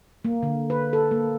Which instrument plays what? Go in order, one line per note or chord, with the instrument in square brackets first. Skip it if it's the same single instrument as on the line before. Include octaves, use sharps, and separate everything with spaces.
[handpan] A#3
D3
B4
A4
A#3